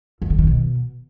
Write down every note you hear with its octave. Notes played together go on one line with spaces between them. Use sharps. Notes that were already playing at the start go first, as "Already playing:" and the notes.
F2
D3
D#3
B2